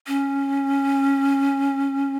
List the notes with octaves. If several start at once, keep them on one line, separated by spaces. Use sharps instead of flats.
C#4